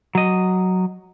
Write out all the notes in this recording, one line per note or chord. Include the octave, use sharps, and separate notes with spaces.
F#3 D#5